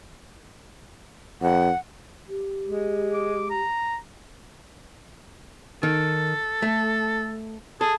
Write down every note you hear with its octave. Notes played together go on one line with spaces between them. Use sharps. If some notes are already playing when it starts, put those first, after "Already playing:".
F2 F#5
G4
G#3
D6
A#5
D#3 A4
A3
G#4 A4